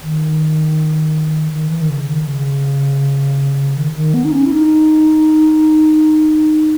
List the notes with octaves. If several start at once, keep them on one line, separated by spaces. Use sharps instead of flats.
D#3
D#3
E3
D#3
C#3
D#3
C#3
D#3
D#3
B3
D#4
C#4
E4
D#4